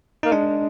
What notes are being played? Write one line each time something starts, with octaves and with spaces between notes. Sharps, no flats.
A#3 D#4
G#3 D4